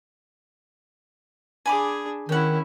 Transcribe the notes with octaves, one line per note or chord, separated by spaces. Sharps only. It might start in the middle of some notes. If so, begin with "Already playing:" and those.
D4 G#4 G#5 B5 D6
D#3 C#4 E4 F#5 G5